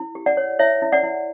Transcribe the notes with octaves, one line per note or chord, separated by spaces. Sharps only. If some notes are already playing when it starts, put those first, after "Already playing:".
Already playing: E4
G4
D5 F#5
C#5
E4 C#5 E5
E4
D5 F#5
E4